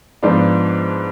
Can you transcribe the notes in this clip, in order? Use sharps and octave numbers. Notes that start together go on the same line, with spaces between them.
G#2 F3 B3 D4 F4